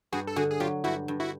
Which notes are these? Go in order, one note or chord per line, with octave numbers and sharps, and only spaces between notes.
G2 F#4 G#4
A4
D3 F#4 G#4
G#4
F#3 F4 G4
G2 E4 F#4
G2
E4 F#4